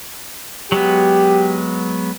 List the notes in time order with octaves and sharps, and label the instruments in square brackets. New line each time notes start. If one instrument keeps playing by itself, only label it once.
[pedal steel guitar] F#3 G#3 B3 [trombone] G4